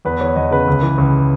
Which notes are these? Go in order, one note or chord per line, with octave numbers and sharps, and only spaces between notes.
E2 B4
E2 C#5
E2 D#5
C#3 B4
C#2
E3
C#2